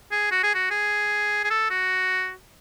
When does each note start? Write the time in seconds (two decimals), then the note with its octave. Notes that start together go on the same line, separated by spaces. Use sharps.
0.12 G#4
0.31 F#4
0.43 G#4
0.54 F#4
0.70 G#4
1.44 G#4
1.51 A4
1.70 F#4